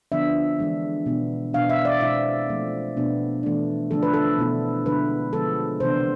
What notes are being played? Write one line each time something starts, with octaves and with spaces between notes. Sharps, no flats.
D3 F3 B3 D4 E5
E3 G#3 D4
B2 B3 D4
B2 B3 D4 F5
E5
D5
B2 G#3 C4 E4 E5
F3 A3 C4
B2 B3 D4
E3 A3 D4
D3 F3 A3 D4 A4
B4
A4
B2 B3 E4
D3 G#3 B3 E4 B4
D3 F3 G#3 B3 A4
C3 E3 B3 D4 C5